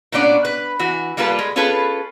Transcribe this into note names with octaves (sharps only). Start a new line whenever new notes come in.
A#2 B3 C#4 D4 D5 F#5
B4
E3 F#4
G3 A#3 F4 A4 B4
G#3
C#4 F4 G#4 A4 B4